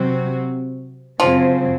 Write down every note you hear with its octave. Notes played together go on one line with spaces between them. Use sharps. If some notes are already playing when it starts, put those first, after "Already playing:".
Already playing: C3 F#3 C4 F#4
F#2 C#3 F3 F#3 C4